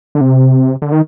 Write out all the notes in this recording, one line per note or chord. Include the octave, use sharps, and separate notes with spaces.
D3
C3
D3
D#3